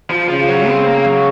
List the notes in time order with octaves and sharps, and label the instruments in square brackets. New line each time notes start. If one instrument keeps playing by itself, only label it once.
[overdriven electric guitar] F3
[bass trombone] C#3 [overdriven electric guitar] F3
[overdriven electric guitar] F#3
C4
A#3
F#3